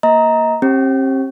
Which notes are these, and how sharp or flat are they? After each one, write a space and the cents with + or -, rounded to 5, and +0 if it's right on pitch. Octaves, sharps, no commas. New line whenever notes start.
A#3 +0 D#5 +30 A#5 +0
C4 +40 G4 +0